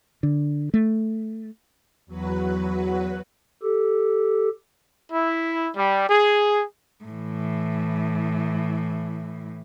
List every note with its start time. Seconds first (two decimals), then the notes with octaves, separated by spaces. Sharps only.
0.23 D3
0.74 A3
2.06 E2 F#3 F#4 B4
3.63 G4 A4
5.10 E4
5.74 G3
6.08 G#4
7.05 A2 E3